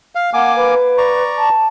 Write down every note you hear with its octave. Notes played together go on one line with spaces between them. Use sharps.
F5
A#3 F#5 G#5 D6
B4
D5 A#5 C#6
A5